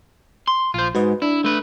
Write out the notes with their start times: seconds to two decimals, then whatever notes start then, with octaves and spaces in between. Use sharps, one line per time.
0.47 C6
0.74 A#1 F4 C5
0.95 G#2 F#4 B4 D#5
1.22 D4 E4
1.45 A3 B4